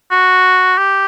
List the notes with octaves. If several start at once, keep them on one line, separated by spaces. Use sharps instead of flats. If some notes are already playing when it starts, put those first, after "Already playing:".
F#4
G4